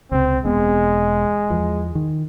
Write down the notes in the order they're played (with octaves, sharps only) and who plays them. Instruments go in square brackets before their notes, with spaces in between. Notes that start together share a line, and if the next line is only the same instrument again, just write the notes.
[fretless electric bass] C#2 C3 [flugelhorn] C4
[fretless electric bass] E1 B3 C4 [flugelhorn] G#3
[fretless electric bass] E2 E3 F3
D#3